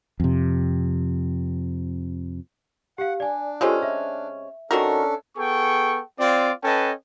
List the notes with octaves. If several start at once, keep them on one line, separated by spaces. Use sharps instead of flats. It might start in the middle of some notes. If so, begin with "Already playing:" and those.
F2 C3
G4 F5 F#5
D4 D5 G#5
C3 G#3 C#4 F4 G4 A4
E5
D#3 C#4 D4 F#4 A4 A#4
B3 G#4 A4 G5 C#6
C4 F4 D5
C#4 A4 B4 D#5 G5 A5